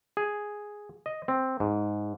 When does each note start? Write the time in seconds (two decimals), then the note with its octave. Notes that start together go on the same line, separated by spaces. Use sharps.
0.17 G#4
1.06 D#5
1.28 C4
1.60 G#2